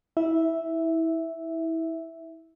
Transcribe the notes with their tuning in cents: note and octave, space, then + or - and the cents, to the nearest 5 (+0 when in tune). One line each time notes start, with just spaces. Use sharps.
E4 -25 E5 +0